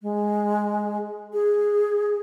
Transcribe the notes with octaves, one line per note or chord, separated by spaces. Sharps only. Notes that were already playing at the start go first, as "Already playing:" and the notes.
G#3
G#4